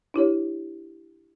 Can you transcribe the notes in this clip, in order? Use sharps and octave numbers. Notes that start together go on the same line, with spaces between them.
D4 E4 G4 C#5